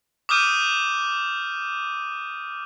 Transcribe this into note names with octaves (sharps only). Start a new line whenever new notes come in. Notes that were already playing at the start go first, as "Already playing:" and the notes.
D6 D#6 F6 G6 D#7